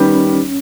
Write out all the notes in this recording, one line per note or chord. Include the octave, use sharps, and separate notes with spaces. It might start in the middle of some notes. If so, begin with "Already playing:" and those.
Already playing: D#3 G3 B3 C#4 G4